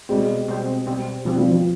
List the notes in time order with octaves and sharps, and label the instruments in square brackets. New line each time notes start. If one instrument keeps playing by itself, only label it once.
[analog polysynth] B2 G3 C4 [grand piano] G#3
[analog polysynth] B2 G3 C4
B2 G3 C4
[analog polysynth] B2 G3 C4 [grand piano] F3
[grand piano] F3
F3